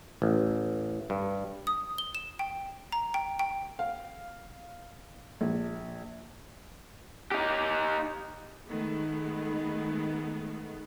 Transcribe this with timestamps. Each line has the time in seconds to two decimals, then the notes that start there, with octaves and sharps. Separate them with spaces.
0.22 A1
1.10 G2
1.67 D#6
1.98 G7
2.15 E7
2.39 G5
2.92 A#5
3.14 G5
3.39 G5
3.79 F5
5.41 A#1
7.31 D#4 G4
8.68 D#3 G#3 A3 B3